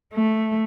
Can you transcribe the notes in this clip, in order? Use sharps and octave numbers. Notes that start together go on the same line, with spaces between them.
A3